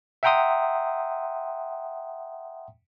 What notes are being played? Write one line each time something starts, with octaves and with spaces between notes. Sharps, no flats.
E5 F#5 G5 A#5 C6 D#6